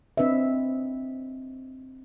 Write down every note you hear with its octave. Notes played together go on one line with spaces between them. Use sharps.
C4 D4 B4 D#5 E5